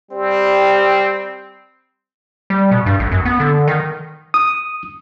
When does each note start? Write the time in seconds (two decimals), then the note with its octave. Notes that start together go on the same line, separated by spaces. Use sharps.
0.11 G3 C4
2.50 G3
2.71 B2
2.86 G2
2.99 A1
3.12 F#2
3.25 B3
3.40 D3
3.68 D#3
4.34 D#6